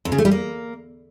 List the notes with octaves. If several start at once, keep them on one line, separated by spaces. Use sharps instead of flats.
F2
C#3
A3
G3
A#3